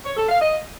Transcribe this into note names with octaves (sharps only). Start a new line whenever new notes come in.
C#5
A4
F5
D#5